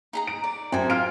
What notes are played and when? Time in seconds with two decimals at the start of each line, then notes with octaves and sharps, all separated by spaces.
0.13 D#4 G#4 A#5
0.27 D7
0.44 D5
0.72 F#2 C4 A4 G#5
0.90 F4 F6 D7